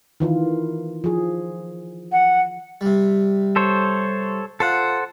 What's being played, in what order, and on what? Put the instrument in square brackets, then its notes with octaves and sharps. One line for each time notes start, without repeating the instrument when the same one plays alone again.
[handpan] D#3 E3 F4
F3 G#4
[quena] F#5
[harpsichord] C3 G3
[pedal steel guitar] A4 C5 C#5
[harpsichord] F4 [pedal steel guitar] A4 C5 F#5